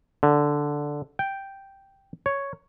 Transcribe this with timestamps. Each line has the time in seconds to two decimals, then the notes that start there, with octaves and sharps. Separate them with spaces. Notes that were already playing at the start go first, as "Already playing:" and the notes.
0.23 D3
1.19 G5
2.26 C#5